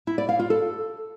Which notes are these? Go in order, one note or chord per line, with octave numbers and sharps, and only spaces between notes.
E4
D5
F5
F4
A4